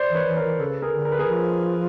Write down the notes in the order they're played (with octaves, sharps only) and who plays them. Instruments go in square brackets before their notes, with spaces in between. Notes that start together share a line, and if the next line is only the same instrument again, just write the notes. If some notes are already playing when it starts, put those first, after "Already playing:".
Already playing: [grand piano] C5 D5
[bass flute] E3
[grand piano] B4 C#5
[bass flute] E3
[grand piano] A#4 C5
[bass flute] E3
[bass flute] C#3 [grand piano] A4 B4
[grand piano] G#4 A#4
[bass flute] D3
[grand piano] A#4
B4
G#4 A#4
[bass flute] F3